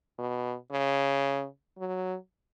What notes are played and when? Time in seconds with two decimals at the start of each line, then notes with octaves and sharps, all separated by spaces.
0.19 B2
0.71 C#3
1.78 F#3